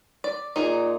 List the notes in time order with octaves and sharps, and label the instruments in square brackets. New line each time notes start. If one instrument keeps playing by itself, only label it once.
[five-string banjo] D5
[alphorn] A#2 [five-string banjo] D#4 G#4